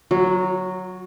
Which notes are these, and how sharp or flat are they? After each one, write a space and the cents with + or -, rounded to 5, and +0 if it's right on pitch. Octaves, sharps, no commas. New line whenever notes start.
F#3 +0 F#4 -40